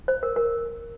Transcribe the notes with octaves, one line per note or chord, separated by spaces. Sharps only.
C5
A#4
A#4